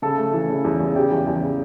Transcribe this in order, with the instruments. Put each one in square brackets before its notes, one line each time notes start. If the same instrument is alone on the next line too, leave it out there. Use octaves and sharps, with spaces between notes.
[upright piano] C#3 A4 A5
A3
E3
C#3
E2
E2
C#3 G4 G5
E2
E2
C#3